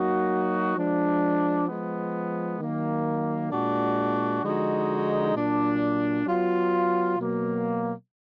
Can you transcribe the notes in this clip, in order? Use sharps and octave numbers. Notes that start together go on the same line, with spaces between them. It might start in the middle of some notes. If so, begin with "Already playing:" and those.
Already playing: F#3 A#3 D#4 F#4
F3 G#3 D4
F3 G#3 B3
D#3 F#3 A#3
A#2 G#3 D4 F#4
D3 F3 G#3 D#4 F#4
A#2 F#3 D4
F#3 B3 F4
B2 F#3 A#3